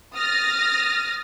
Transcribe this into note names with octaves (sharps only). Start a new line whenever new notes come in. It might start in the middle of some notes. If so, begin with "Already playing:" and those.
D#6 F6 A6 A#6